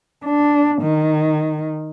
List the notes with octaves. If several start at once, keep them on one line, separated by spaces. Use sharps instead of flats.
D4
D#3